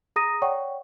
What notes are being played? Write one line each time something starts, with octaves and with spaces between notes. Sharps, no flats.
G#4 A#5 D#6 A#6 D#7
C#5 D5 F#5 G5 C#6